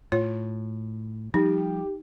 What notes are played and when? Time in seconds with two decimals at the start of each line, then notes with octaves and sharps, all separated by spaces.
0.12 A2 F4 C#5
1.34 F3 G3 D#4 G4